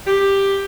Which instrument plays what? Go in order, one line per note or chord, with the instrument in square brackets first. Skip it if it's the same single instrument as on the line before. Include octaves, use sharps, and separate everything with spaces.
[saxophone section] G4